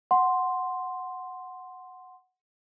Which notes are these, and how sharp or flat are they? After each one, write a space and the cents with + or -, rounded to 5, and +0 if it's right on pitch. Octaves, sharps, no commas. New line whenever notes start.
F#5 +0 C6 +0